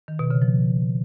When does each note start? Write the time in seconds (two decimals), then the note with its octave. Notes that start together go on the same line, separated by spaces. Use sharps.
0.08 D#3
0.19 B2
0.31 C#3
0.42 F3